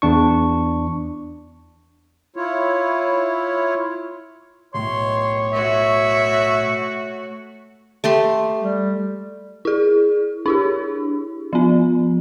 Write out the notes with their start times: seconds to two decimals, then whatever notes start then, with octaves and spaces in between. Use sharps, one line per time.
0.02 E2 D4 C#6
2.36 E4 F4 C#5
4.74 B1 A2 C3 C#5 C6
5.53 A3 F#4 E5
8.04 A3 G4 C6
8.62 G3
9.65 E4 G#4
10.46 D4 E4 G4
11.53 F3 B3